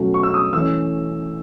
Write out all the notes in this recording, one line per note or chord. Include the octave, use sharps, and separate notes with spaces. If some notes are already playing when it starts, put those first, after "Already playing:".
Already playing: B2 F#3 A3 C#4
C#6
E6
D#6
E3 A3 C#4 E6